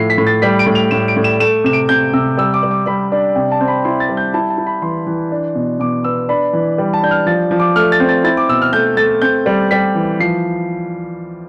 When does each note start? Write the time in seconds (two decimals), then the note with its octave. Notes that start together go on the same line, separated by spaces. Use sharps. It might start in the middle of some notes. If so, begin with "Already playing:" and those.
Already playing: A2 F3 E4 C7
0.10 B6
0.18 A2
0.27 A6
0.42 G3 B6
0.59 D7
0.66 A2
0.75 F7
0.91 A2 E7
1.08 D7
1.17 A2
1.24 E7
1.40 A3 E7
1.64 C3 E7
1.73 D7
1.89 C3 G6
2.13 C3 E6
2.37 G3 E6
2.54 D6
2.63 G3
2.71 D6
2.86 G3 B5
3.12 D4
3.35 C3 G5
3.52 A5
3.61 C4
3.68 B5
3.85 E4 C6
4.00 A6
4.09 G3
4.17 G6
4.34 E4 A5
4.50 A5
4.58 E4
4.67 B5
4.82 E3 C6
5.07 E3
5.32 D4
5.55 B2
5.80 B2 D6
6.04 B3 E6
6.29 D4 B5
6.53 E3
6.78 G3
6.94 A5
7.03 D4 G6
7.11 F6
7.26 F3 A6
7.51 F3
7.60 D6
7.76 A3 F6
7.92 A6
8.00 C4
8.09 A6
8.24 E4 A6
8.37 D6
8.49 B2 E6
8.62 F6
8.73 A3 G6
8.97 A3 A6
9.22 C4 G6
9.46 G3
9.71 G3 B6
9.95 E3
10.20 F3 C7